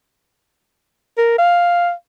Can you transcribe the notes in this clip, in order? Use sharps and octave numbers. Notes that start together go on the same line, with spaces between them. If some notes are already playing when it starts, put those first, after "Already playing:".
A#4
F5